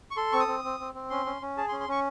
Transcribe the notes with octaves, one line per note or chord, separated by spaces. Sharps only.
C#6
A4 C6
C4 C#6
D#6
C4
C4
C4
C4
C#4 C6
C#4
C#4
G#4 A5
C6
C#4
C6
C#4 C#6